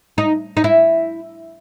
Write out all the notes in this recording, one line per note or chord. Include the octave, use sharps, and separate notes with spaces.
D#4
D#4
E4